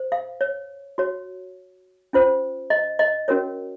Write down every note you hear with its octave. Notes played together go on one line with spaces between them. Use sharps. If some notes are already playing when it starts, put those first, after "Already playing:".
Already playing: C5
F5
C#5
F#4 C#5
C#4 F4 C5
D#5
D#5
C#4 F#4 A#4 C#5